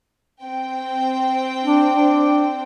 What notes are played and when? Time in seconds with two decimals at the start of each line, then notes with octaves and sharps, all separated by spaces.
0.45 C4 G5
1.64 D4
1.93 D4